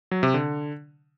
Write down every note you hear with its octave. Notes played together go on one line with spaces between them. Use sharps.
F#3
C3
D3